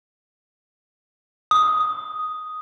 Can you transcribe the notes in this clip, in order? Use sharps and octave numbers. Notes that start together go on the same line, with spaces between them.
D#6